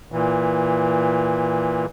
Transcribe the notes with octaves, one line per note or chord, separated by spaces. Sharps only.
A#2 E3